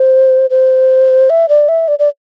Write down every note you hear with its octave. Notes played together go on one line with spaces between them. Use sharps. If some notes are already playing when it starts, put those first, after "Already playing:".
Already playing: C5
C5
E5
D5
E5
D5
D5